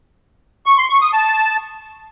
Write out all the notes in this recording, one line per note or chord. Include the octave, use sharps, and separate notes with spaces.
C#6
C6
C#6
D#6
A5